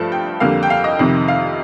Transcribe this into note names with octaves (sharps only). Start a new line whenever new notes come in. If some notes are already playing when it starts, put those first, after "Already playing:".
Already playing: G2 F3 A3 A5
G5
F2 D3 G3 A#3 F5
G5
F5
D#5
F2 C3 D#3
F5